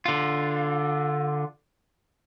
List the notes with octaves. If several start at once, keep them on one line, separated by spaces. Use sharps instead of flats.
D3 F4